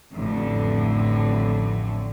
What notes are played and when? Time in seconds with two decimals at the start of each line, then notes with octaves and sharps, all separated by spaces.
0.14 A1 F2 A2 D3